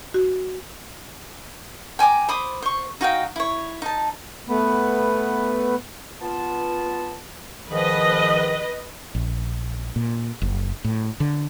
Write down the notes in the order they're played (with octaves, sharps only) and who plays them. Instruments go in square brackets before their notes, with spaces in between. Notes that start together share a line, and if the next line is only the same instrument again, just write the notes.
[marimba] F#4
[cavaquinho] G5 G#5 A#5 D6
C5 B5 D6 D#6
C5 C#6
D#4 F#4 F5 G5
E4 C#5
D#4 A5
[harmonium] A3 B3 B4
[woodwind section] B3 F4 A5
[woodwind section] G#2 D#3 F3 [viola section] B4 D#5
[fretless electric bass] A#1
A#2
F#1
A2
D3